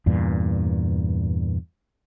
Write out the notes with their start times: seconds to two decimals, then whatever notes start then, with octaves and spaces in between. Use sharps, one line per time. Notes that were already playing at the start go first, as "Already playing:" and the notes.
0.06 E2 G2 A#2